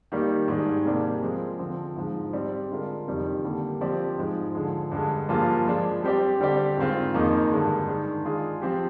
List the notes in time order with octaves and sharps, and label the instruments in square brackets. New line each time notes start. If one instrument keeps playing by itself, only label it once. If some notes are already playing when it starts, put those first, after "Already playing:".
[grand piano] D#3 G3 A#3
G#2 D#3 G3 D4 G#4
C3 G3 A#3 D4 G#4
F3 G#3 C4
D3 F3 C4
G#2 F3 G#3
G3 C4 G4 D5
D3 G#3 D4 F4 A#4
F2 C3 D#3 G3
D3 G3 A#3
F3 C4 G4 D5
G#2 F3 G#3
D3 F3 G#3
G2 D3 G#3
G2 F3 A#3 F4 G#4
F3 G#3 D4
G3 C4 G4 D5
D3 G3 C4 G4 D5
G#2 D#3 G#3 C4 F4
F2 D#3 A#3 D#4 G#4
G2 D3 G#3
D#3 G#3 D4
G#3 D4 F4 G#4
F3 C4 G4